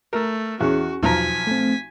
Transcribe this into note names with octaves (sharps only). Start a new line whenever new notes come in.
A3 A#4
E2 C#4 F#4 G#4 C#6
B1 E2 F3 G#5 A#5 B6
A3 C4